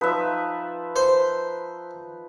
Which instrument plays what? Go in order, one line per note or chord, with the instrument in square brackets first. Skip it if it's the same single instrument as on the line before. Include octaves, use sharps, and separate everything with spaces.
[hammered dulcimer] F3 D#4 [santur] B4 E5
[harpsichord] C5